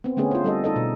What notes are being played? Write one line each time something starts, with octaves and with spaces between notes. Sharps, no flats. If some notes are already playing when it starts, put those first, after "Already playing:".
B3 C4
D3 A3 B3 C#4 G#4
F4 C5
G3 A4 D#5
D#4 A4 D#5
B2